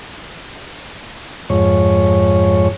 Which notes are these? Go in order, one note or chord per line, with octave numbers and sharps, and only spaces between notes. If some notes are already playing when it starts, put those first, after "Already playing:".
F2 G#2 C#5